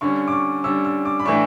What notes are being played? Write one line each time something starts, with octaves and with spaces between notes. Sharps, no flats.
D3 G3 C#4 C#6
D6
C#6
D3 G3 C#4 E6
E6
D6
B5
A2 E3 A3 D4 C#6